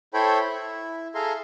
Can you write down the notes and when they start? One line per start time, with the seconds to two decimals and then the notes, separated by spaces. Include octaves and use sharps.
0.14 E4 A4 C5 C#5 G5 B5
0.49 E4
1.15 G#4 A4 E5 F5 A#5 C6